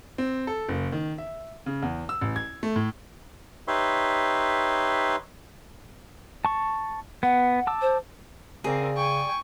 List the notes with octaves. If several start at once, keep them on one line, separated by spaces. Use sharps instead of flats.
C4
A4
F#1
D#3
E5
C#3
E2
E6
A1
G#6
A3
A2
D#4 G4 B4 C#5 E5 C6
A5 C#6
B3 F#5
A5 D6 E6
C5
C#3 C4 G#4 A#4 D5
G5 G#5 C#6